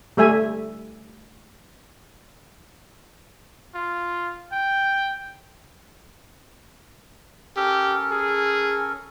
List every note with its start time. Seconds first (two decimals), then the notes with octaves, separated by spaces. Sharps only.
0.17 G3 A3 E5 G#5
3.75 F4
4.52 G5
7.56 C#4 G4 A4 A#4
8.11 G#4